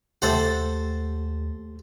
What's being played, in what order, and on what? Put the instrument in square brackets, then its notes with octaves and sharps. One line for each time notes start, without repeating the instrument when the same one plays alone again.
[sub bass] D#2 [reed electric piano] A3 G4 [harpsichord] A4 C5 F#5